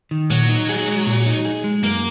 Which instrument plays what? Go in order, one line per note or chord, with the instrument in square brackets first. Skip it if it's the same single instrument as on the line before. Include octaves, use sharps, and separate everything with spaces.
[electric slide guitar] D#3
[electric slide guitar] A#2 [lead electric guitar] F#3
[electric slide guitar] D#4
G#4
G#3
A#2
D#4
G#4
G#3
[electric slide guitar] F#2 [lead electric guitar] A#3